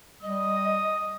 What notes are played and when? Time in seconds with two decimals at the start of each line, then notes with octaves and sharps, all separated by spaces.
0.22 G3 D#5 D#6